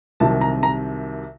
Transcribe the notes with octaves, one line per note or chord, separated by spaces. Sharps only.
C2 C3 D#3 F#3 A5
A#5
A#5